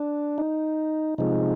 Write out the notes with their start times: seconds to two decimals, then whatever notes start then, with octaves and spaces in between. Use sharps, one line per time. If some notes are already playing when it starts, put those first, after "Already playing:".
Already playing: D4
0.38 D#4
1.18 C3 F3 G#3 D#4